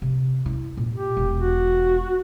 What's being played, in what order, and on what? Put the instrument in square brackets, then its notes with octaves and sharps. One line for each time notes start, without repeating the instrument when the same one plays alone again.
[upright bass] C3
E4
A#2
[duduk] G4
[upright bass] E1
[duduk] F#4